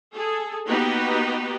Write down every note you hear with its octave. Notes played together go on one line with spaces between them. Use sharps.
G#4 A4
A#3 B3 D#4 F#4 G4 B4